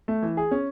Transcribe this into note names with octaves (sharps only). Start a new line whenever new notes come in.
A3
E3
G#4
C#4